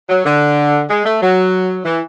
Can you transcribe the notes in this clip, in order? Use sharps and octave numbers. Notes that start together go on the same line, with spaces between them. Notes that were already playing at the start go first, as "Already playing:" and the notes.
F#3
D3
G#3
A3
F#3
E3